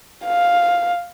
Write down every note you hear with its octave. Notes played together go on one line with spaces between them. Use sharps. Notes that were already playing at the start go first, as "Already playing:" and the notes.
F5